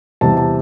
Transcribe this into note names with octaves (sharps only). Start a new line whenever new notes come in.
E2 C3 G3 A5
A5